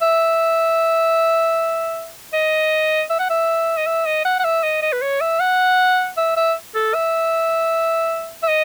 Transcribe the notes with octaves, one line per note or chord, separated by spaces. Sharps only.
E5
D#5
E5
F#5
E5
D#5
E5
D#5
F#5
F#5
E5
D#5
D#5
B4
C#5
E5
F#5
E5
E5
A4
E5
E5
D#5